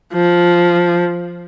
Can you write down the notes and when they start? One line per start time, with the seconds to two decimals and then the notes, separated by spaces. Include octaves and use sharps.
0.14 F3